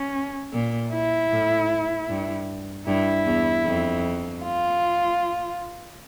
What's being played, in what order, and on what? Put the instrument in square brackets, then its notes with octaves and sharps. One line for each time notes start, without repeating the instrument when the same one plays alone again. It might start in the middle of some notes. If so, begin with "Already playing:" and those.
Already playing: [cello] C#4
[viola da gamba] A#2
[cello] E4
[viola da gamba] A2
G2
[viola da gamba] G2 [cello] E4
[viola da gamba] E2
F2
[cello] F4